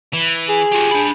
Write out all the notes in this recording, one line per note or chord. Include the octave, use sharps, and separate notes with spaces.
E3
G#4
F4 G4
D4 B5